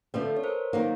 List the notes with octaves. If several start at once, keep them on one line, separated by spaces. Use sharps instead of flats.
D3 F3 A3 C4 A4 B4
C#5
A#4 C5
D#3 F#3 A#3 D#4